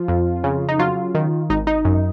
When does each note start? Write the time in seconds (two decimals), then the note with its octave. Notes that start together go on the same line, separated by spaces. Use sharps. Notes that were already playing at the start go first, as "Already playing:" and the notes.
Already playing: F3 F4
0.08 F2
0.44 C#3
0.69 D#4
0.79 F#3 F4
1.15 D#3
1.50 G#1 D#4
1.67 D#4
1.85 F#2